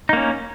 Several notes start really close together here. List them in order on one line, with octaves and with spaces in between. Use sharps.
D#4 A#3 C#4